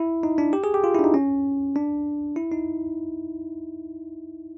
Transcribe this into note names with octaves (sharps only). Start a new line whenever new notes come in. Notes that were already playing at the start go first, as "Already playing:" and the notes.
Already playing: E4
D#4
D4
G4
G#4
G4
F4
E4
D4
D#4
C#4
D4
E4
D#4